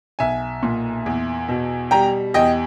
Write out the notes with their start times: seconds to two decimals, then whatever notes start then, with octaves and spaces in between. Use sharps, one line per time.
0.19 B1 E5 G#5
0.63 A#2
1.06 E2
1.48 B2
1.91 G3 G5 A#5
2.34 E2 D#5 G5